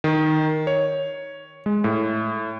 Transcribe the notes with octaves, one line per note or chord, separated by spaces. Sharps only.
D#3
C#5
G#3
A2